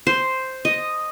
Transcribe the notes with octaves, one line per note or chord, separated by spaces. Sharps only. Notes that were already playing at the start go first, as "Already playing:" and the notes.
C5
D#5